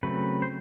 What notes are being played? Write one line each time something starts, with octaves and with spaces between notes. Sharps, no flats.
C#3 F#3 A3 C4 B4
C5